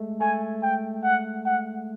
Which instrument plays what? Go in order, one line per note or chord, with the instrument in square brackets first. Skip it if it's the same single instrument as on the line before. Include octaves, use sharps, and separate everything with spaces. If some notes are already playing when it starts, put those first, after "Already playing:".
Already playing: [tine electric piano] G#3 A3
[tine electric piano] A3 [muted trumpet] G#5
[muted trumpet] G5
F#5
F#5